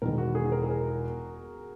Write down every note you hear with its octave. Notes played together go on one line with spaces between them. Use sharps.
E1 E2 D#3 A#4
F#4
G#4
G#4
A#4
G#4
A#4